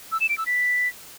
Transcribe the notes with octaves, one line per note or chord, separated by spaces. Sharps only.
E6
E7
D7
E6
B6